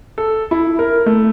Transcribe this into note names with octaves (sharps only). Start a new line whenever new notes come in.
A4
E4
A#4
A3